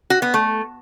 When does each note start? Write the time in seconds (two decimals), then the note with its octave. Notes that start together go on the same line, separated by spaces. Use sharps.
0.10 F#4
0.22 B3
0.34 A3